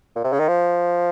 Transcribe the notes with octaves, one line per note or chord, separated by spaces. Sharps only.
A#2
C3
C#3
D#3
F3